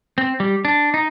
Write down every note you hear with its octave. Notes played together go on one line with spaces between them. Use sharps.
C4
G3
D4
D#4